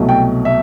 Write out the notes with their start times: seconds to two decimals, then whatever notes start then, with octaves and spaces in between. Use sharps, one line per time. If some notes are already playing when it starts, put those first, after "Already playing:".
Already playing: C2 B2 F#3 A3
0.09 G5
0.45 E5